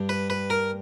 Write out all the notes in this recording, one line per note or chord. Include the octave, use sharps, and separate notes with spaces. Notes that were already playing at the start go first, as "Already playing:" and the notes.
Already playing: G2 G3
B4
B4
A#4